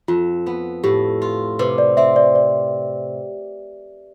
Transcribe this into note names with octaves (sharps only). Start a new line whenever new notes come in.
F2 F4
B3
A2 G4
F4
C3 B4
D5
C4 E5
D5
D5